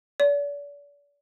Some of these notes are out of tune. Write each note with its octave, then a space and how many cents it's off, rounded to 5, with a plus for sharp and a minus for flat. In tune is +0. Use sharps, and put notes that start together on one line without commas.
D5 -40